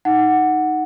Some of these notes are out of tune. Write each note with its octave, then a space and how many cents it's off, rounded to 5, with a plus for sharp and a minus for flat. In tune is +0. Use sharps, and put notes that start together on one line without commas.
D#4 +0 F#5 +0